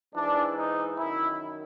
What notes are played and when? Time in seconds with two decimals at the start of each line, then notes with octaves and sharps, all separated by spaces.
0.15 G#2 E3 D4
0.57 D#4
0.98 F#2 D#3 E4